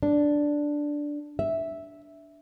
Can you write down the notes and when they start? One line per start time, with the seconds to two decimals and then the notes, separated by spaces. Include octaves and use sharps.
0.03 D4
1.39 E5